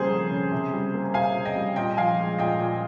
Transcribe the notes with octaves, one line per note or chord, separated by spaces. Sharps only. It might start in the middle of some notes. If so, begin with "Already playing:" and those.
Already playing: F2 C#3 G3 A#3 G#4 C5
F2
C#3
C3
G3
A#3
C3 F5 G#5
C3
D#5 G5
G3
A#2 D#5 G5
F3 F5 G#5
G#3
A#2 D#5 G5
A#2